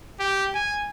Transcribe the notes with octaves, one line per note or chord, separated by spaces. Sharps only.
G4
G#5